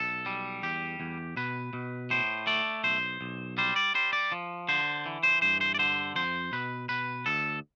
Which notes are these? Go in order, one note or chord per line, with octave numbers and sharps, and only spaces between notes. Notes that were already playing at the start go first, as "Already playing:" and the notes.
Already playing: B1 A4
G3
E2 G4
E2
B2 B4
B2
A2 C5
A3 D5
B1 C5
B1
G3 C5
D5
G3 C5
D5
F3
D3 C5
E3
C5
G2 C5
C5
D5
D3 C5
F2 C5
B2 B4
B2 B4
D2 A4